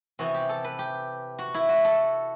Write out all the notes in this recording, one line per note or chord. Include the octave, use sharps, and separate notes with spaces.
C3 E3 B3 F#4
G4
A4
B4
G4
F#4
E4
F#4
A4